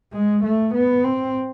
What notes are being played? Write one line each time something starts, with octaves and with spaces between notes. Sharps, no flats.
G#3
A3
B3
C4